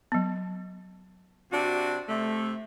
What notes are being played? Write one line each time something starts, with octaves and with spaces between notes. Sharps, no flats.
F#3 B3
C3 D4 F#4
C3 A3